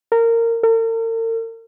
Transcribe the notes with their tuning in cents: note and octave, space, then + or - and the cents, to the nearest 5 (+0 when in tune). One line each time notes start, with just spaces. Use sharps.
A#4 -20
A#4 -45